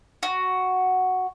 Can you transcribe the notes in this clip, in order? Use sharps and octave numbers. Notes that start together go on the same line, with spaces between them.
F#4